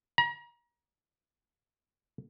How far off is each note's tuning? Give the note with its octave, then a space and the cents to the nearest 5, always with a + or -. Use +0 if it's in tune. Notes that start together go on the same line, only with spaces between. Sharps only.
A#5 +35